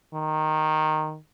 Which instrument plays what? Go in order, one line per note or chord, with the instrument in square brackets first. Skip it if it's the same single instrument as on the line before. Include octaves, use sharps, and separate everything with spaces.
[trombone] D#3